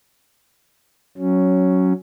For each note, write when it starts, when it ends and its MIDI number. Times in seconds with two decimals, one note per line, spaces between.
1.18 1.93 54
1.18 1.93 61